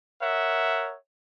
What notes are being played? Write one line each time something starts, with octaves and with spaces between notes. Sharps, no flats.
A#4 C#5 E5 F#5